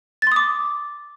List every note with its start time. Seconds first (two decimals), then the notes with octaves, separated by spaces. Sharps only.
0.22 A6
0.27 C6
0.32 D#6
0.36 D6